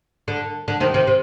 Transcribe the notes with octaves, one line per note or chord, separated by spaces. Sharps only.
D3
D3
C3 D#3
C3 D#3
C3